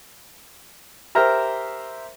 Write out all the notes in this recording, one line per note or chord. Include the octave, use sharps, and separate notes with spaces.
G4 A#4 C5 E5 A#5 F6